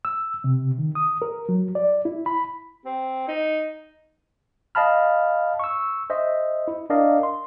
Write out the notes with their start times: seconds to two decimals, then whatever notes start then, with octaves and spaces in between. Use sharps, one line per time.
0.05 E6
0.44 C3
0.78 D#3
0.95 D#6
1.22 A#4
1.49 F#3
1.75 D5
2.05 E4
2.26 B5
2.86 C4
3.28 D#4
4.75 D#5 F5 A5 B5 F6
5.59 C#6 E6
6.10 C5 D#5 E5
6.68 E4
6.90 D4 A#4 D5 D#5 F5
7.23 C6